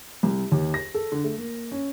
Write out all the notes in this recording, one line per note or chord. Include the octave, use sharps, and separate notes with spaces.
C2
D#2
A#6
A4
D3
A3
A#3
C#4